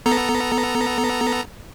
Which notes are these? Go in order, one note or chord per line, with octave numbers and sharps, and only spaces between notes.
B3 A4 A#5